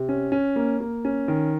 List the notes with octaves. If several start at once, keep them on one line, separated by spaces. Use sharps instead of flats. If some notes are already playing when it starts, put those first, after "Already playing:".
Already playing: C3
C#4
C#4
A#3
A#3
C#4
D#3